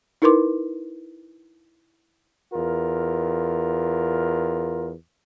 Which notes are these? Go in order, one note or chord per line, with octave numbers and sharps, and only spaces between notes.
D#4 E4 A#4 B4 C6 D6
E2 F4 A#4